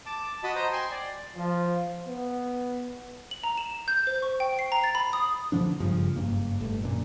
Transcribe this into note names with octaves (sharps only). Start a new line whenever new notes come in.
A5 D6
F#4 D#5 A5 B5
C5 D#5 A#5
G5 G#5 C6
D5
F3
B3
F#7
A#5
E7
G6
C5
C#6
G5
C7
A#5
A6
B5
D#6
D1 D3 F3 D4
F#1 G2 C#3 F3
F#1 G2 A#3
G1 A2
F#2 A#2 D3